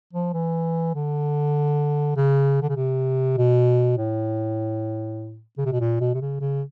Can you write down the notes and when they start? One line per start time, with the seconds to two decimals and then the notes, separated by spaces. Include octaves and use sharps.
0.13 F3
0.33 E3
0.95 D3
2.16 C#3
2.62 D3
2.69 C#3
2.76 C3
3.37 B2
3.97 A2
5.58 C#3
5.65 C3
5.72 B2
5.80 A#2
6.00 B2
6.14 C3
6.21 C#3
6.41 C#3